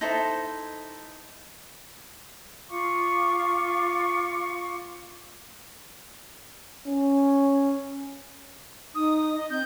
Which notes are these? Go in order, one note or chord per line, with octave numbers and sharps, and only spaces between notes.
D#4 E4 A4 C5
F4 F5 C#6 D6
C#4
D#4 D#6
D#5
C4 G6